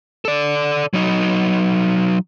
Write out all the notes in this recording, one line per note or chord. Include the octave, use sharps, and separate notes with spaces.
A4 D5
F#3 D#4